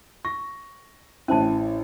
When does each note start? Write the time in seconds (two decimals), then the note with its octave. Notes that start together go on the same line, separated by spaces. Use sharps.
0.25 C#6 A#6
1.28 A1 C#4 E4 C5 A5